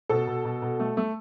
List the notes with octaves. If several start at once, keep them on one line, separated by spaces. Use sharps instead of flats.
B2 A4
B2
B2
B2
A3
A3